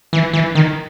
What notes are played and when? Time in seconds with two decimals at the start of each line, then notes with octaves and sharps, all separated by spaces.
0.13 E3
0.33 E3
0.55 D#3